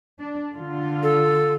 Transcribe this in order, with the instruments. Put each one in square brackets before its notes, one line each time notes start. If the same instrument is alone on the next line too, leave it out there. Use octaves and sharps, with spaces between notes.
[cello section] D4
D3 F4
[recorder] A4